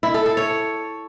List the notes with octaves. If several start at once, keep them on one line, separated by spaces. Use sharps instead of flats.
E4
A4
A4
C#5